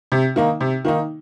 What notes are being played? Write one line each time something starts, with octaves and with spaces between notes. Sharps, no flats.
C3
D#3 A#3 D#4
C3
D#3 A#3 D#4